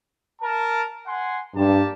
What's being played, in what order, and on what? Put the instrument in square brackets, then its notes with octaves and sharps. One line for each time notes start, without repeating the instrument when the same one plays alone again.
[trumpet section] A#4 A5
F#5 G#5 C6
[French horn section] G2 [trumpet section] A#3 G4 A5